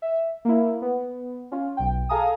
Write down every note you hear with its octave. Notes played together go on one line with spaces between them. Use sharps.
E5
A#3 E4
B3
C#4 F4
B1 G5
G#4 A4 F5 G#5 A#5 D#6